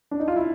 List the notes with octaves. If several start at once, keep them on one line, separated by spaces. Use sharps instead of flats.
D4
D#4
F4
E4